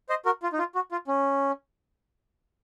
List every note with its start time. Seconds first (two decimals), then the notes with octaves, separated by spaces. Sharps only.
0.09 C5 D#5
0.25 F#4 A#4
0.43 F4
0.53 D#4
0.59 F4
0.75 F#4
0.92 F4
1.08 C#4